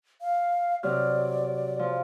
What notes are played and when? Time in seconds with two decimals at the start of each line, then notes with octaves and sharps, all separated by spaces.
0.21 F5
0.83 C3 F#3 D5 F6
1.79 F3